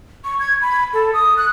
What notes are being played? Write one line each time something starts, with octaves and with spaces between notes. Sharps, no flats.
C#6
G#6
B5
A4
D#6
F#6